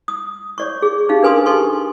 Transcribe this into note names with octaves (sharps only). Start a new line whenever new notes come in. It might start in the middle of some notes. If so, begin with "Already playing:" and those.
D#6
C#5 D5 C#6
G#4
C#4 D#4 G4 F5
D4 A#4 B4 G#5 C6 D#6
D#4 G4 A4 G#5 C6 C#6